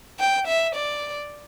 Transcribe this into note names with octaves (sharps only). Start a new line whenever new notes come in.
G5
E5
D5